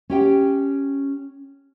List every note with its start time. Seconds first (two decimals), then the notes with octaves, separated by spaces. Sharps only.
0.10 C#4 G4 G5